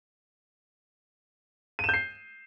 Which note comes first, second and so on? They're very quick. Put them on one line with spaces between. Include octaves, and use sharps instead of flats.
D#7 E7 G6 C7